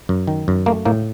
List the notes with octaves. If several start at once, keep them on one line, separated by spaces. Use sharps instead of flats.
F#2
D#3
F#2
A3 A#3
A2 A#3